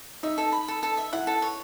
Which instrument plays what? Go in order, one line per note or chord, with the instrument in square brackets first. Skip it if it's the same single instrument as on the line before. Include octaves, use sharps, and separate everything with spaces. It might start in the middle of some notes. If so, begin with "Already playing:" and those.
[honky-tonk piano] D#4 [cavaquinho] E5
[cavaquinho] A4
B5
A4
A4
E5
[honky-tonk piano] E4 [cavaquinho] F#5
[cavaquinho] A4
C#5